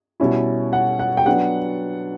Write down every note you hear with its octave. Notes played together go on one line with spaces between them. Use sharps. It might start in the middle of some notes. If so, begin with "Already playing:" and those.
B2 G3 C#4 E4
F#5
F#5
G5
F#3 B3 D4 F#5